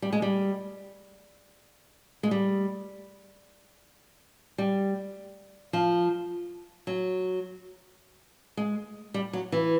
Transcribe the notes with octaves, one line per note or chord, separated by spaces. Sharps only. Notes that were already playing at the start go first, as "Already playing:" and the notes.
G3
G#3
G3
G#3
G3
G3
F3
F#3
G#3
G3
F#3
E3